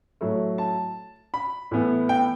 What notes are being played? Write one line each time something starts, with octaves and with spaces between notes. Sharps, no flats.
A2 F#3 A3
A5
B5
A2 E3 B3
G5